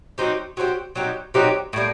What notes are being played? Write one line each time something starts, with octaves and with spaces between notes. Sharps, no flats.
F#3 C4 D#4 G4
F#3 C4 D#4 G4
F#3 C4 D#4 G4
F#3 C4 D#4 G4
A2 G3 A#3